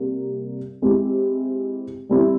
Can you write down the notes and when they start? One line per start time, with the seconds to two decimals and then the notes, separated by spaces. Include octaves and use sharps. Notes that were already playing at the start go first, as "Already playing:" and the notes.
Already playing: C3 G3 A#3
0.82 G#3 C4 E4 G4
2.09 G3 C4 E4